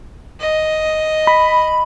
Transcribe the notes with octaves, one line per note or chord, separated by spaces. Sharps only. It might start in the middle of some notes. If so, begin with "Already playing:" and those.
D#5
B5